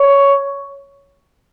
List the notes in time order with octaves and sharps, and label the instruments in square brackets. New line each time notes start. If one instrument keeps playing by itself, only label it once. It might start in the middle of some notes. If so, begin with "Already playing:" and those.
Already playing: [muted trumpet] C#5